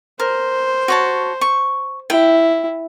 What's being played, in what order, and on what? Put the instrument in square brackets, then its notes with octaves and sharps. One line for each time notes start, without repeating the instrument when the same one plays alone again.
[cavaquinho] A#4 [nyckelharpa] C5
[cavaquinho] F#4 C#5 A5
C#6
[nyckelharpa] E4 [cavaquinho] G5